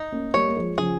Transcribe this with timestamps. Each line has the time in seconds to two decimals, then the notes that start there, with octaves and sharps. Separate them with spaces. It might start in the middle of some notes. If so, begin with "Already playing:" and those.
Already playing: D#4
0.12 A#3 C#4
0.34 G3 A#3 C#5
0.48 A#3
0.57 F3 G#3
0.78 C#3 F3 G#4